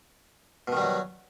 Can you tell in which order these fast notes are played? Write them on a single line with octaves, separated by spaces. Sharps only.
B2 D#3 G3 F#3